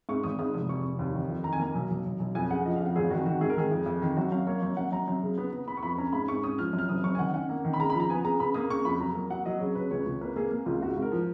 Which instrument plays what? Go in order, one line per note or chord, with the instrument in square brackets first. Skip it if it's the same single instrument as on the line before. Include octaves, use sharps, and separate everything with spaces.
[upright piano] G#2 C#6
G#1 D#6
G#2 D#6
F1 D#6
F1 C#6
F1
D#2
D#3
F2
D#3 A#5
G#5
A#3 A#5
B1
B1
B1
B1
F2 G#5
C#3 F#5
F3 D#5
F5
F2
F#5
G#1 G#4
D#3 F#4
D#3 F#4
G#2 G#4
A#4
D#3 G#4
F2
F2
D#3
F#2 F#4
F#2 F5
A#3 C#5
F#2
F#2 F#5
F#2 A#5
F#2
C#3
B3
B3
B3 B5
C#6
F2 B5
C#4 A#5
G#2 B5
G#2 C#6
C#4 D#6
F3 F6
F#2
F6
F#1 D#6
F#2 C#6
G#5
D#3 F#5
C#4 F#5
A#3
D#3
B5
C#3 A#5
B5
F3
A#5
B3 G#5
C#3 A#5
C#3 B5
A#3 D#6
C#3 C#6
F2 B5
F#3 A#5
A#3
F#3 F#5
F#3 D#5
C#3 C#5
C#3 B4
C#2 C#5
C#2
A#3 B4
A#3 G#4
A#3
C#2 F4
G#2 F#4
G#2
A#4
F3